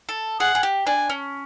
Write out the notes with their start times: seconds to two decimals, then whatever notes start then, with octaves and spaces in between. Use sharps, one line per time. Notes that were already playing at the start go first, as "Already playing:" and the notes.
0.09 A4
0.40 G#4 F#5
0.55 G#4
0.63 G4
0.87 D4 G#5
1.10 C#4